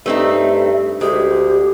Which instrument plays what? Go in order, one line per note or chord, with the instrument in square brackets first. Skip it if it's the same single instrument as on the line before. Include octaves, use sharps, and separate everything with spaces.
[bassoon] G2 [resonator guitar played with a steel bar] A3 C4 D#4 [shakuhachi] E5
[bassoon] D2 [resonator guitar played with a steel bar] G#3 [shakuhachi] G4